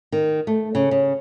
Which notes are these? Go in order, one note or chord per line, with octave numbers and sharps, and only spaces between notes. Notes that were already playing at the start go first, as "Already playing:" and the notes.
D#3
A3
C#3
C#3